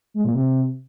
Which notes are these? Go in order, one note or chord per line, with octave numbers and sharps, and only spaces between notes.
G#3
A#2
C3